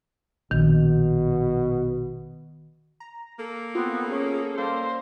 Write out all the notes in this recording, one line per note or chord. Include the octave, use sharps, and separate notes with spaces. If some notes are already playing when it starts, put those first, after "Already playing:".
A#1 B2 D#3
A#5
A#3 A4
B3 C4 F4
C#4 G#4
G3 A#3 A4 C5